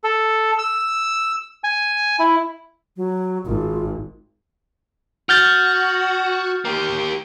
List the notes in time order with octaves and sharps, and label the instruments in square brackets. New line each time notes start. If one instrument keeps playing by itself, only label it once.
[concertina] A4
E6
G#5
E4
[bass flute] F#3
[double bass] G#1 [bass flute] F4
[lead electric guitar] F#4 [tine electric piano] F6 G6 A6
[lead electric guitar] A#3 G4